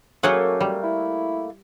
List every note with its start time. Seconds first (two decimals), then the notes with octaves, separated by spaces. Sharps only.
0.23 F#2 F#3 A3 A#3 G#4 F#5
0.61 G3
0.83 E4